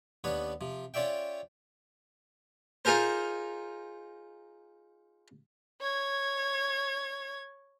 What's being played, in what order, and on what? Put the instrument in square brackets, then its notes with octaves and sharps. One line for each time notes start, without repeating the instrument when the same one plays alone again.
[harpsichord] D#2 B3 D4 B4 C#5
C3 F3
C#4 F4 C#5 D5 E5 G5
D#4 F4 G#4 A#4 C5
[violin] C#5 G#6